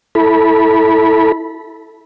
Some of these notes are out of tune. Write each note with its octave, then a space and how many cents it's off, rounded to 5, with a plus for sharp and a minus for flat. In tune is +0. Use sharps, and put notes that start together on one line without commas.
E4 -10 A4 +0 B5 -20